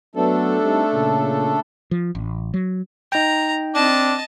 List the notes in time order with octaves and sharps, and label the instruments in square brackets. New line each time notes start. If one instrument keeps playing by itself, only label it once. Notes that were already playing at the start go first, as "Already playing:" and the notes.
[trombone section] F#3 B3 [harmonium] A3 D4 A4
[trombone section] G3 C4 D#4
A#2 C#3
[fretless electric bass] F3
A1
F#3
[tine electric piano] D#4 G5 [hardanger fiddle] A#5
[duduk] C4 [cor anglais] D4 [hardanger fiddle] D#5 A5